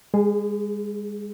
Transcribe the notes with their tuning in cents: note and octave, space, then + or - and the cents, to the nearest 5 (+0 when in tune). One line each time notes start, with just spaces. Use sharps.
G#3 -35 G#4 +15